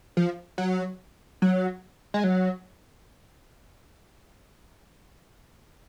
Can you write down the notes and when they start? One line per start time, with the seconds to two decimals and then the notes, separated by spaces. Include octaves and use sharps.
0.17 F3
0.58 F#3
1.42 F#3
2.14 G#3
2.24 F#3